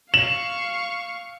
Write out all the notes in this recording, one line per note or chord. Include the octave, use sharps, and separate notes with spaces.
F5 C#6 E7 F#7